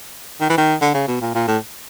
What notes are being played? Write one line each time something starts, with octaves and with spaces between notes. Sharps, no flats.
D#3
E3
D#3
D3
C#3
B2
A#2
A#2
A2